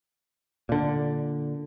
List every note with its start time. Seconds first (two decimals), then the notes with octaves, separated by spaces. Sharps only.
0.69 A#2 D3